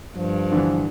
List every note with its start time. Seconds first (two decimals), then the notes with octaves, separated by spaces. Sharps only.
0.16 G2 F3
0.52 D3 E3